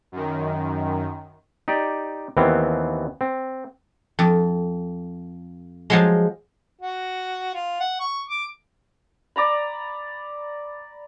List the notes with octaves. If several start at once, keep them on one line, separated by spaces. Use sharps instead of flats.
F#2 D#3
D#4 G4 D5
D#2 E3 B3 C4 F5
C4
F2
F3 F#3 G#3
F#4
F4
F#5
C#6
D6
D5 A#5 B5